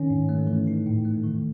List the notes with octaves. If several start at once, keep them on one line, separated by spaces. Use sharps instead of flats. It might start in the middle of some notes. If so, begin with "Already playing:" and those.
Already playing: D#3 C#4
G#2
A3
E3
D#4
A2
A3
D#3